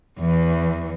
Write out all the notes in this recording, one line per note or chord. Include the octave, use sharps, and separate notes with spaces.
E2 E3